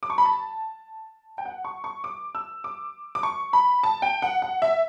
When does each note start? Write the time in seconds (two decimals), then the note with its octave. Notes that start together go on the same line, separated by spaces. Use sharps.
0.03 D6
0.10 C#6
0.18 B5
0.25 A5
1.38 G5
1.45 F#5
1.65 C#6
1.84 C#6
2.04 D6
2.35 E6
2.64 D6
3.15 D6
3.23 C#6
3.53 B5
3.83 A5
4.02 G5
4.22 F#5
4.42 F#5
4.62 E5